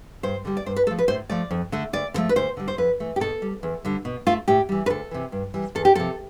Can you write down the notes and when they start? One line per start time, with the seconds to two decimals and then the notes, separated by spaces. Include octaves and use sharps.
0.23 G2 C5
0.45 D3 G3
0.57 D5
0.66 G2 C5
0.76 B4
0.87 F3 A3 A4
0.98 B4
1.08 A2 C5
1.30 F3 A3 D5
1.51 F2
1.72 D3 A3
1.93 D2 D5
2.14 D3 F3 A3
2.29 B4
2.36 D2 C5
2.57 D3 G3
2.68 C5
2.78 F2 B4
3.00 E3 A3
3.16 G4
3.20 B2 A4
3.42 G3
3.63 E2
3.85 D3 G3
4.05 B2
4.27 A3 F4
4.48 A2 G4
4.69 E3 G3
4.86 B4
4.90 D2 A4
5.11 C3 E3
5.32 G2
5.54 E3 G3
5.75 E2 A4
5.85 G4
5.95 C3 F3 A4